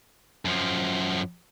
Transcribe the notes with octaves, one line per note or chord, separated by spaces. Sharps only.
F#2 F3